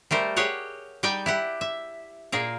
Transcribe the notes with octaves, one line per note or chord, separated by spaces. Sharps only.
G3 A3 A#4 C5
G4 G#4 C#5 F#5 G#5
G3 D#4 D5 G5 G#5
E4 G4 F#5
E5
A#2 A#3 G#4 A#4